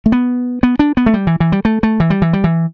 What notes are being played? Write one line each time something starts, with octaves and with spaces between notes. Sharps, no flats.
A3
B3
B3
D4
B3
A3
G3
E3
E3
G3
A3
A3
E3
G3
E3
G3
E3